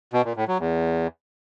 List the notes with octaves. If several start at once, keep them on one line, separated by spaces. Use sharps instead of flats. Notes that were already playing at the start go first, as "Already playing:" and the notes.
B2
A#2
A2
F#3
E2